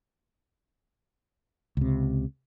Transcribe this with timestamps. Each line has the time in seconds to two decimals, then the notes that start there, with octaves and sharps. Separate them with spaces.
1.77 C#2 C3